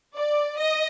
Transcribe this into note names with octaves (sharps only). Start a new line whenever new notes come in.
D5
D#5